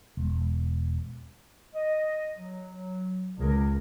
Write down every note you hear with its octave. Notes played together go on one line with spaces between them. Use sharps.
E1
D#5
F#3
C#2 G#4 A#4